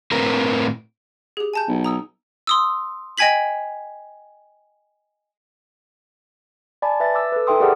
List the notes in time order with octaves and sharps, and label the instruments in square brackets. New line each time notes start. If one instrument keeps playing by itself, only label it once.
[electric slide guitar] A2 C4 A#4 B4
[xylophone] G4 G#4
G#5 A5 G6
[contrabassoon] B1
[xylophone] A#5 D#6 E6
C6 D#6 E6
D#5 G5 G#5 G#6 B6 F#7
[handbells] D5 G#5 A5 B5
B4 E5 A6
D6 E6
A4 B4
D#4 A4 E5 G5 C6 D#6
G4 G#4 A#4 D5 F#5